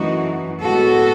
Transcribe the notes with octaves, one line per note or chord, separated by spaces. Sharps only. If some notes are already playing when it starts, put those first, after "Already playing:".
Already playing: F#2 E3 A3 D#4 F#4
A2 G#3 B3 F#4 A4